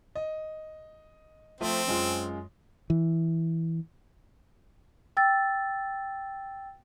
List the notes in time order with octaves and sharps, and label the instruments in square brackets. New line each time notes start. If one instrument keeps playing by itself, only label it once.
[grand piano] D#5
[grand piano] F3 A3 F4 [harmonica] C4
[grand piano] F#2 G#3 F4
[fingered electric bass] E3
[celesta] G5 E6 A6